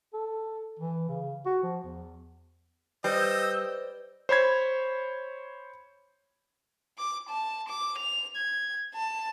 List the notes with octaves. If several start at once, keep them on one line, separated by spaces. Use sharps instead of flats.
A4
E3
C#3
F#4
F3
E2
G3 B4 C5 D#5 E6 G6
C5 C#5 B5 G#6
D6
A5
D6
F7
G#6
A5